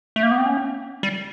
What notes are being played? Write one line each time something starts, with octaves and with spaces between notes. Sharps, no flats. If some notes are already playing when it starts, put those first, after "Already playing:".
A3
A#3
B3
C4
C#4
G3